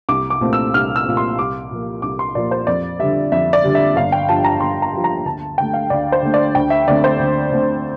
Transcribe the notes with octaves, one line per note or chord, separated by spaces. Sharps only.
C2 D6
D6
A#2 A3 C4
E6
C2 F6
E6
A#2 A3 C4
C6
C2 D6
A#2 F3 A#3
C2 D6
C6
A#2 F3 A#3 D5
C5
F2 D5
D3 G3 E5
F2 E5
D5
D3 G3
E5
G1 F5
G5
G2 F3 A5
A#5
G1 C6
A#5
G2 F3
A#5
D2 A5
D3 A3 G5
F5
D2 D5
C5
D3 A3
D5
D2 G5
E5
D3 A3 C4 D5
C5
D2
D3 A3 C4